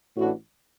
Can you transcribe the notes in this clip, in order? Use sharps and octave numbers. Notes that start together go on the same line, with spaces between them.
A1 A2 E3 D4 F#4